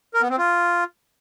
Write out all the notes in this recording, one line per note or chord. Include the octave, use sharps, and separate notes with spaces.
A#4
B3
C4
F4